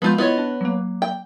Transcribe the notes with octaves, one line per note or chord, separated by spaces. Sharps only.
F3 G#3 B3 F4 G6
B3 E4 F4 C#5 D#5
D4
F#3 A#3
G5